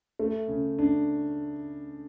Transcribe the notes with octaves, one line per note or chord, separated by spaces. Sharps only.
A3
C#3
D4